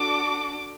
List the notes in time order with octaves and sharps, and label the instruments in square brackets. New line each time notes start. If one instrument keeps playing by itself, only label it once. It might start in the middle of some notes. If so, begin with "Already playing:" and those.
Already playing: [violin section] D4 F#4 A4 D6